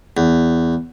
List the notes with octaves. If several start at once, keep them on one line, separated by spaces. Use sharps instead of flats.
E2